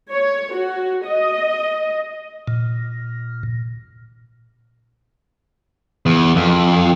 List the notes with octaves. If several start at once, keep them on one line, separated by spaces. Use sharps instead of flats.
C#5
F#4
D#5
A#2
E2
F2